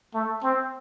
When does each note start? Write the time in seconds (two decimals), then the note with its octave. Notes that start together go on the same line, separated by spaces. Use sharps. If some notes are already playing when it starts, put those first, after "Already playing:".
0.14 A3
0.44 C4